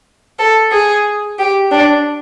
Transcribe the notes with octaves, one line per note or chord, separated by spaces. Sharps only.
A4
G#4
G4
D4